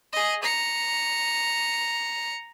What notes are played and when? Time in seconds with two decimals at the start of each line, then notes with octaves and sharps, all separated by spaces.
0.13 G#4 D#5
0.43 A#5 C#7